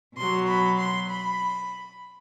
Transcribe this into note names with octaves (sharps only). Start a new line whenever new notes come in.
B2 F#3 C6
B5
C6
B5